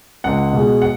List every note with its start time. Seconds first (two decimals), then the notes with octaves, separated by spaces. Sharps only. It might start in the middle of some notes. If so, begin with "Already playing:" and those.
0.24 C#2 F#5
0.53 B2 G#3
0.82 F#5